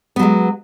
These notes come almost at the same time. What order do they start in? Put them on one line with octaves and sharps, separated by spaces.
B3 F#3 G#3